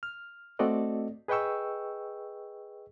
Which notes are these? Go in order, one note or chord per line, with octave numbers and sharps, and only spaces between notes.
F6
A3 C4 F#4 A4 D5 D#5
G#4 B4 D#5 G5 C#6 E6